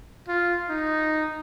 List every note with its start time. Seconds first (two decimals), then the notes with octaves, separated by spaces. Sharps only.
0.28 F4
0.69 D#4